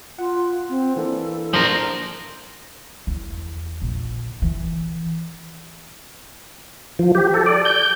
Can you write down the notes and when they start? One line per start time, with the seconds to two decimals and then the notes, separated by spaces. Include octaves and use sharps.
0.19 F4 F#5
0.70 C4
0.97 E3 A#3 D4 A4
1.54 F3 D4 A#4 C5
3.07 E2
3.82 A#1
4.42 E3
6.99 F3
7.15 G4
7.34 A4
7.46 D5
7.65 G6